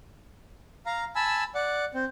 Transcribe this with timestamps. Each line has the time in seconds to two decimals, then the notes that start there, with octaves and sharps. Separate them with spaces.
0.86 F5 A#5
1.16 G#5 A5 B5 E6
1.55 D5 F#5
1.94 C4